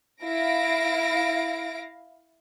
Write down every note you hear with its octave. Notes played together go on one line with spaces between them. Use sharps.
E4 F5 A#6 D7